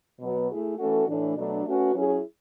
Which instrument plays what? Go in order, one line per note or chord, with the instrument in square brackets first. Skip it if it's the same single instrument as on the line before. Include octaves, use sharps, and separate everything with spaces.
[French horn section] B2 F#3 B3 F#4
A3 E4 G#4
E3 A3 C#4 F#4 A4
A2 E3 A3 D4
B2 F#3 A3 D4
A3 C#4 F#4 B4
F#3 C#4 E4 G#4